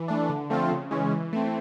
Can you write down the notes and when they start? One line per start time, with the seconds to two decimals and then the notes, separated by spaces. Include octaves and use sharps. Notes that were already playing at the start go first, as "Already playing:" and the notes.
Already playing: E3
0.08 A3 D4
0.29 D3
0.50 F3 A3 C4 F4
0.71 C#3
0.91 E3 G#3 C#4
1.11 E3
1.33 A3 C4